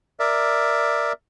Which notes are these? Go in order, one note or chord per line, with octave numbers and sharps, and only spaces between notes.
A#4 D5 E5